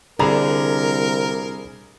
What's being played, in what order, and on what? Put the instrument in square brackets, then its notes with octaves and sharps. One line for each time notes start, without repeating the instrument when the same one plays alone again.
[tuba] C2 [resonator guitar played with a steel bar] D3 [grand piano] G#4 A#5 B5 [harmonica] A#4